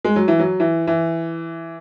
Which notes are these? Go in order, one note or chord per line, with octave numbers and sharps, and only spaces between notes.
G#3
F#3
E3
F#3
E3
E3